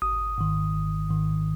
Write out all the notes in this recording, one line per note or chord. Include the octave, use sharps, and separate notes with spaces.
G#1 D#6
G#2 D#3
G#1
G#2 D#3